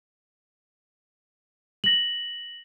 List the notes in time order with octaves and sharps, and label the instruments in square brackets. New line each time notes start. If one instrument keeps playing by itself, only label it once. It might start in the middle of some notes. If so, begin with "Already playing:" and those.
[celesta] A#6 F#7